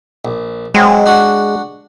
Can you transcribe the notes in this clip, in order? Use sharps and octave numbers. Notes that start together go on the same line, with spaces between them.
A#1
F#3 G#3 C4
D4 F#4 F#5